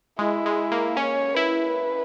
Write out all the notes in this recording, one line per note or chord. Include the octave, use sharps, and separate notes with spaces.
G#3 E4
G#3
A#3
C#4 C#5
E4 B4